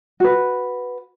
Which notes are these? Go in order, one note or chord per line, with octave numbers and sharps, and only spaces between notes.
F#4 B4